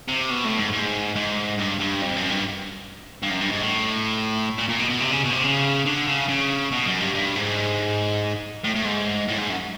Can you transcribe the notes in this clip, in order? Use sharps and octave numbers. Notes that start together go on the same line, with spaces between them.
C3
B2
A2
G#2
G#2
G#2
G2
G2
F2
F#2
G2
G2
F#2
G2
G#2
A2
A#2
A#2
B2
B2
C3
C#3
B2
C3
C#3
D3
C#3
C#3
B2
F#2
G2
G2
G#2
A2
A2
G#2
A2
G#2
F#2